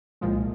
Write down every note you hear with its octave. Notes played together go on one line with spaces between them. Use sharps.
C2 A#2 F3 G#3